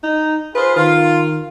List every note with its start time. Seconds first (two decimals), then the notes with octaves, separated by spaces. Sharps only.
0.03 D#4
0.55 F4 G#4 B4 C5
0.76 D#3 F4